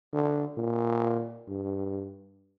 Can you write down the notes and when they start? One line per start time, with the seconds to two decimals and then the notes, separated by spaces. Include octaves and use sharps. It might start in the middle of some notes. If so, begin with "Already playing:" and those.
0.13 D3
0.57 A#2
1.48 G2